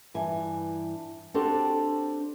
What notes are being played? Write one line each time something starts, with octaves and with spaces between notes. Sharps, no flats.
G2 E3 G#5
C4 D4 F#4 G4 A4 C5